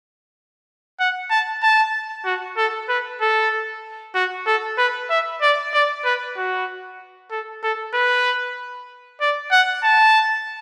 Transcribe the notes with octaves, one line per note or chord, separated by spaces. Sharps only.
F#5
A5
A5
F#4
A4
B4
A4
F#4
A4
B4
E5
D5
D5
B4
F#4
A4
A4
B4
D5
F#5
A5